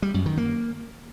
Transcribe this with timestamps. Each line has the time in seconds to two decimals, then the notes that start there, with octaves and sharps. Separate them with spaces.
0.02 G3
0.14 F#2
0.26 D#3
0.37 A#3